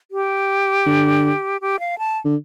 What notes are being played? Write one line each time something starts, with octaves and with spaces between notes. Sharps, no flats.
G4
D3
G4
F5
A5
D3